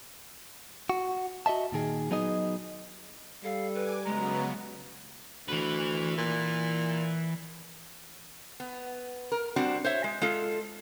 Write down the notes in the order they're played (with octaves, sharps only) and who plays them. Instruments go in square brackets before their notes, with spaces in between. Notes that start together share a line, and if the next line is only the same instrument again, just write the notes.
[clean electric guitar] F#4
F#4 D#5 E5 A5
A#2 D#3 G#4
F#3 B3 D#4 G#4 D#5
[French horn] G3 [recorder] A4 [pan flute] F5
[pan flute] B4 [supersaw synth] G#5 D6
[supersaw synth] C#3 F#3 B3 [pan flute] G#3 [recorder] A#5
[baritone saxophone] D2 [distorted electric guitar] E3 B4
[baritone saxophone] A#2
[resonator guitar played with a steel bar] B3
A#4
G3 C4 D4 F#4
C5 C#5 E5
G#3
G#3 F4 A4